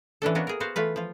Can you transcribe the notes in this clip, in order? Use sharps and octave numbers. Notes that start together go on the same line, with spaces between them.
E3 C#4 D4 A4
A#3 B3 D4 F#4 C#5 D#5
G#4 A#4
B3 F#4 C5 F5
E3 A3 F4 B4
F3 F4